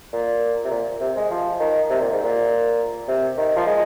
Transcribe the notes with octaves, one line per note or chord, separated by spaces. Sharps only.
A#2
C3
A#2
C3
G#3
F3
D#3
C3
A#2
G#2
A#2
C3
D#3
F3
G#3